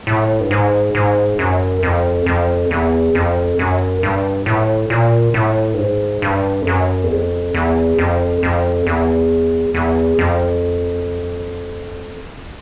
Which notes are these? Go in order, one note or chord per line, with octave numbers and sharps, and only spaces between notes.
A2
G2
G#2
G#2
F#2
F2
F2
E2
F2
F#2
G2
A2
A#2
A2
G2
G#2
G2
F2
F#2
E2
F2
E2
F2
F2
E2
E2
F2